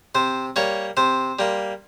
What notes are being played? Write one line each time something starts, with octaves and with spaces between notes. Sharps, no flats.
C3 C5
G3 A#3 C#5
C3 C5
G3 A#3